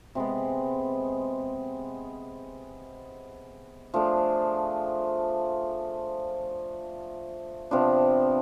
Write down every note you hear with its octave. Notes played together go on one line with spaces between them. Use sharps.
C3 G#3 B3
F3 A3 D4 G#4
C3 F3 B3 D4